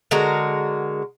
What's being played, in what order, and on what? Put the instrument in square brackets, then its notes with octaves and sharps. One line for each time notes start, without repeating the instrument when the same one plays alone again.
[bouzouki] D3 G#3 F#4 A#4